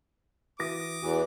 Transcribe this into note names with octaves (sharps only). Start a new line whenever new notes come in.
E3 F#4 D6 D#6 A#6
E2 E3 F#4